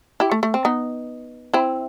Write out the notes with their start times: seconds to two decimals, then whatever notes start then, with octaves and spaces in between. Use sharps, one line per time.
0.20 E4 G4
0.32 A3
0.43 A3
0.54 C4
0.65 B3 D#4
1.53 C4 E4